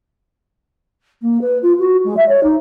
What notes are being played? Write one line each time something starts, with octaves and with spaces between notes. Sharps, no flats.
A#3
B4
F4
F#4
G#3
E5
C#5
D#4